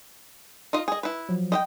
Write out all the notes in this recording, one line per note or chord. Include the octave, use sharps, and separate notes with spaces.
D#4 F4 D#5
G#4 D#5
E4 B4
F3 F#3
D#5 E5 G5